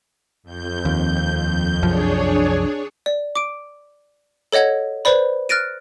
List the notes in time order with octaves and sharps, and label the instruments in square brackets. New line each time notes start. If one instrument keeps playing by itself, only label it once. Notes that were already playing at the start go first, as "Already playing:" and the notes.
[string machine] F2 G6
[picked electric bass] D#2
[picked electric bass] C2 F#2 F3 [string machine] D4 G#4 C#5
[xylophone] D5
D6 D7
A4 C#5 D#5 F#5 G#6
B4 C5 D5 B5
F6 F#6 A6 A#6 D7 D#7